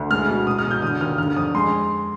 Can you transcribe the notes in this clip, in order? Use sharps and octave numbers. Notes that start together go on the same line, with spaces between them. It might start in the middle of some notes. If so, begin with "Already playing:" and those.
Already playing: D2
G#3 F6
B2
G#3 D#6
F6
B2
G6
D3 D#6
D#2 F6
D3 F6
F2 D#6
G#3 C6